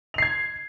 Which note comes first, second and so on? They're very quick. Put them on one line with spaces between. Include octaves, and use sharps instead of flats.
F7 C7 G#6